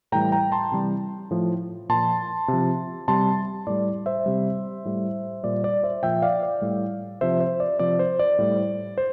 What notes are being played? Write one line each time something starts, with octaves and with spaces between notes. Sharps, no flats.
A2 E3 G3 G5 A#5
G5 A#5
A5 C6
C3 E3 G3
A2 F3
A#2 F3 A5 C6
C3 F3
C3 G3 A5 C6
A2 G3 D5
C5 E5
C3 G3
A2 G3
A#2 G3 D5
D5
C5 E5
A#2 F3 E5 G5
D5 F5
D5
A2 G3
C3 F3 C5 E5
C5
D5
C3 F3 D5
C5
D5
A2 G3
C5